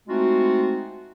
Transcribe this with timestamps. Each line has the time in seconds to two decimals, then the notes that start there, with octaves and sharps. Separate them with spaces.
0.08 G#3 A3 C4 D#4 F4 F#4